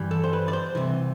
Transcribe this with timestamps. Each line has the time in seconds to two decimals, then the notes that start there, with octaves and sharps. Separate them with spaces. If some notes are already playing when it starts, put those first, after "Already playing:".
Already playing: G2 E3 G3
0.11 A4
0.24 C5
0.33 B4
0.48 D5
0.53 C5
0.75 C2 C3 E3